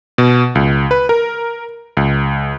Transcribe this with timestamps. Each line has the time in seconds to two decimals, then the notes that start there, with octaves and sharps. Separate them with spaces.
0.18 B2
0.55 C#2
0.91 B4
1.09 A#4
1.97 C#2